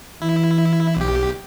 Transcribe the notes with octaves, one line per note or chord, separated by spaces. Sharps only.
E3 E4
B1 G4